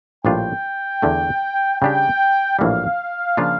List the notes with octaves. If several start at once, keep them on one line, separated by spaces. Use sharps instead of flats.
A#1 A2 G3 D4 F4 G5
E2 D3 A3
C#3 G3 D4 G4 G5
A#1 A2 E3 G3 F5
C#3 F3 A#3 D4 F4